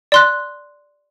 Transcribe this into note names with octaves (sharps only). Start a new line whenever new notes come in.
D5 C6 F#6